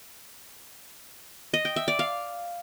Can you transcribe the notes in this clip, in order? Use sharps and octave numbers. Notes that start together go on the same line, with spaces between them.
D#5
G5
E5
D5
F5